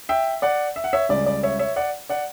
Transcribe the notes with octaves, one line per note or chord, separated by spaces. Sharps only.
E5 G5
D5 F#5
E5
F#5
C#5 E5
C#2 C#3 G3 D5
D5
C#5 E5
C#5 E5
D5 F#5
D5 F#5